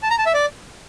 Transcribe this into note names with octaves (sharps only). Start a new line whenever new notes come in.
A5
A#5
A5
E5
D5